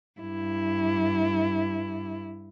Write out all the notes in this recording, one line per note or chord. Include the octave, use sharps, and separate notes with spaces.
G2 E4